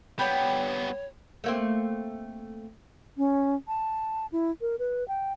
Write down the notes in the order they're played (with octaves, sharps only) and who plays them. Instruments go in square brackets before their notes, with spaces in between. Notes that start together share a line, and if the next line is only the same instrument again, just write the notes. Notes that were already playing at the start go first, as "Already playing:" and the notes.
[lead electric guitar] G3 B3 [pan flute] C#5 [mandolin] G5 B5
[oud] A3 A#3 C4
[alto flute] C#4
A5
E4
A#4
B4
G5